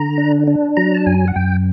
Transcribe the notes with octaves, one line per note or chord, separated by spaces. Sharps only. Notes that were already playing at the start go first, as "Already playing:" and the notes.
Already playing: D3 A#5
D4
D4
F#3 A#5
A5
F#2 G#5
F#5
F#2 G5